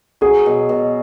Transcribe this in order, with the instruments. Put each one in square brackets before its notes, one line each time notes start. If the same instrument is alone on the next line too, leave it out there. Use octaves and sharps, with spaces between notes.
[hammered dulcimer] F#3 [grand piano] G#4
[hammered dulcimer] B2
B2